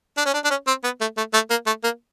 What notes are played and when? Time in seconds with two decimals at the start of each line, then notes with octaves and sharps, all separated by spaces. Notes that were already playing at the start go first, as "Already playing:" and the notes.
0.17 D4
0.26 C#4
0.34 D4
0.44 D4
0.50 C#4
0.67 C4
0.84 B3
1.01 A3
1.17 A3
1.34 A3
1.50 A#3
1.67 A3
1.84 A#3